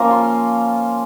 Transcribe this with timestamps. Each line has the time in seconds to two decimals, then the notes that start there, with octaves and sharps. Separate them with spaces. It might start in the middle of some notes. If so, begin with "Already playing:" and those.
Already playing: F3 A#3 C#4 F4 A#5
0.11 C6